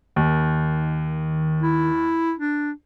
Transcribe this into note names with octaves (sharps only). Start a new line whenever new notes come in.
D#2 D#3
E4
D4